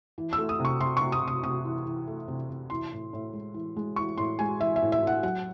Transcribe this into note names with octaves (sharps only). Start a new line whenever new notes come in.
E3
E6
A3
D#6
C3 C#6
C3 C6
C3 C#6
D#6
C3
D#6
C3 D#6
E3
E3
A3
C3
C3
E3 C6
A2
A2
G#3
E3
G#3
E3 C#6
A2 C6
G#3 G#5
E3 E5
E5
A2
E5
A2 F#5
F#3 F#5